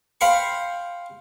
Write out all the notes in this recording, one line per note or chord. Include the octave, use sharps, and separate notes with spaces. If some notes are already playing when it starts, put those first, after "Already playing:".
C5 F5 G5 B5 C#6